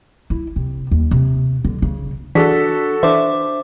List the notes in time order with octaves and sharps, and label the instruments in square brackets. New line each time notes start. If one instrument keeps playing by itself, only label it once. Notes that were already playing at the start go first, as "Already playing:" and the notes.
[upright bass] E4
C3
D#2
C3
D3
C#3
[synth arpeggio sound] E3 G#4 [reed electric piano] D4 [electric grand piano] F#4 A4 [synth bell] B6
[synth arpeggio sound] E3 [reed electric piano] D4 C5 [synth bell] E5 D6